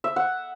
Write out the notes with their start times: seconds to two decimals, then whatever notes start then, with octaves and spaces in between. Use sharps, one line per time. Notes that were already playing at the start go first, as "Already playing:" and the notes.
0.04 E5
0.16 F#5